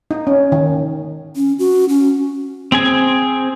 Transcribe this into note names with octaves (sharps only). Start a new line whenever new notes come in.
D#4
C#4
D#3
C#4
F#4
C#4
C4 G#4 G#5